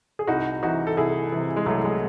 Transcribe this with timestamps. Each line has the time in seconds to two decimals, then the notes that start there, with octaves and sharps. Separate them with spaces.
0.19 G#4
0.27 C2 D#4 F#4
0.63 C3 E3 D#4 F#4
0.87 A4
0.97 C2 E4 G#4
1.32 C3 E3
1.56 G#3
1.66 C2 F#3 A3
1.84 G#3